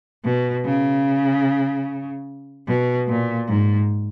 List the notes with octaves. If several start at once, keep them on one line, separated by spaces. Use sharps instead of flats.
B2
C#3
B2
A#2
G#2